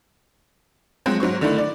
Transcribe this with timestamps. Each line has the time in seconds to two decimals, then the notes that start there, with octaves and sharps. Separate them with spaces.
1.06 F3 F#3 G#3 C4 F#4
1.20 G#2 F#3 C5 C#6
1.41 D3 D#3 A3 D4 E4
1.58 D5